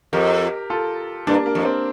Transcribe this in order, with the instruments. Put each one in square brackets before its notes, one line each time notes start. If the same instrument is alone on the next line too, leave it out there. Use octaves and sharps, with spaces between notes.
[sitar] F2 [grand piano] G4 A#4
[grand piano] F4 A4
[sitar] G2 [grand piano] A#3 D4
[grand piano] A#3
[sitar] F2
[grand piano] C4